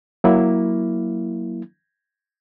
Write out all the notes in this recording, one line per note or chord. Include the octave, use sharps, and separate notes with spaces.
F#3 A#3 E4